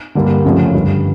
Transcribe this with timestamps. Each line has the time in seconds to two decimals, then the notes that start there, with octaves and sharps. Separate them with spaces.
0.15 G2 D3 G3 A#3
0.45 F#2 C#3 F3 A3 C#4
0.74 G2 D3 G3